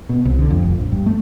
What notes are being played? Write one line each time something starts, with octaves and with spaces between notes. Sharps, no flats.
B2
C2
D3
F2
F1
A#1
G2
A3